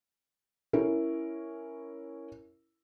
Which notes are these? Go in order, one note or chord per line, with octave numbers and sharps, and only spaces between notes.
C#4 E4 A#4